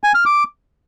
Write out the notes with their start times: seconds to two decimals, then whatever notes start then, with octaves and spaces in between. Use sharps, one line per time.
0.04 G#5
0.15 F6
0.26 D6